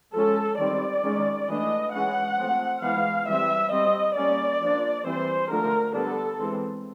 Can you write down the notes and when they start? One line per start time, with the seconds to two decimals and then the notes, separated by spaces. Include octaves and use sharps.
0.14 F3 G#3 C#4 A4
0.59 D#3 G3 C4 D5
1.03 D#3 G#3 C#4
1.48 E3 A3 D4 D#5
1.93 E3 G#3 C#4 F#5
2.38 F3 A3 C4
2.82 E3 G#3 B3 F5
3.27 E3 G3 C4 E5
3.72 G3 C4 D#5
4.16 G3 A#3 C#4 D5
4.61 F3 A#3 D4
5.06 E3 G3 C4 C5
5.51 D3 F3 A3 A#4
5.95 D3 G3 B3 D4 A4
6.39 E3 G#3 C4